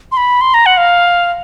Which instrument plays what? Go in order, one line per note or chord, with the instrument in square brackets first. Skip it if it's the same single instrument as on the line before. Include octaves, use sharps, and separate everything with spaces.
[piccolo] C6
B5
C6
A#5
F#5
F5